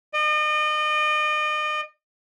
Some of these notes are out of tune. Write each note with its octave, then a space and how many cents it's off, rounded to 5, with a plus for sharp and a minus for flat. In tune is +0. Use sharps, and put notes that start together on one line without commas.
D#5 -40